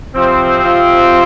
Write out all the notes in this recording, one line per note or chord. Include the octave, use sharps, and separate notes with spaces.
C3 F3 C4
F4